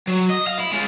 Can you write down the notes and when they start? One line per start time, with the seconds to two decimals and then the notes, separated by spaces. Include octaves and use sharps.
0.07 F#3
0.30 D#5
0.47 F5
0.60 E4
0.72 G#3 F4